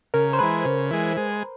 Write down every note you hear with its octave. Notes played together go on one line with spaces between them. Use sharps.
C#3 A#4
C5
E3 G#3 B4
C#3
E3 G#3
G#3